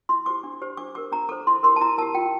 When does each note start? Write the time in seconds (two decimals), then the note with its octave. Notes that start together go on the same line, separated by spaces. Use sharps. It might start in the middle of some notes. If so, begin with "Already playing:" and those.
0.09 E4 C6
0.26 G4 C5 D6
0.44 D4
0.62 G4 C5
0.77 D4 D6
0.95 G4 A#4 D6
1.12 D4 A#5
1.29 A4 C5 D6
1.47 E4 C6
1.63 G4 A#4 C6
1.76 A5
1.81 E4 A#5
1.98 G4 A#4 A5
2.15 F4 G5